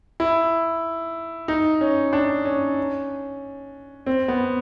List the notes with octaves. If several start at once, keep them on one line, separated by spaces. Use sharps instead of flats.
E4
D#4
C#4
D4
C#4
C4
B3